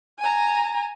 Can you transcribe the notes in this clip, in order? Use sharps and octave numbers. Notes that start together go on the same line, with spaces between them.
G#5 A#5